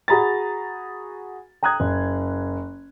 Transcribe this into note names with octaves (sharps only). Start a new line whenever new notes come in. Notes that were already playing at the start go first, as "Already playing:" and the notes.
F#4 G#4 A#5 B5 A6
G5 A#5 D#6 F#6 G#6
F#1